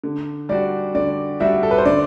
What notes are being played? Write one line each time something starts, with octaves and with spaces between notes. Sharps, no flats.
D3
G3 D4 F#4 D5
D3 D5
G3 D4 F#4 E5
A4
B4
C5
D3 D5